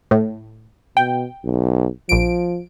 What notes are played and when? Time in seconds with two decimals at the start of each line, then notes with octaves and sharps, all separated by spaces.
0.11 A2
0.97 B2 G5
1.44 B1
2.09 A#1 F3 D7